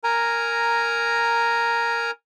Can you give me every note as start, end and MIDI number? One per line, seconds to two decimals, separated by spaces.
0.04 2.11 70
0.04 2.11 80
0.04 2.11 82